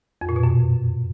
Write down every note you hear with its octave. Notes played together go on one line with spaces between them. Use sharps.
F2
A#2
B2
F#2